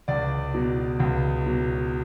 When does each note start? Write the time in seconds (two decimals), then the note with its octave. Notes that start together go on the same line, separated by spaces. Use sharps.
0.08 C#2 D5
0.54 B2 F#3
1.00 C#2
1.46 B2 F#3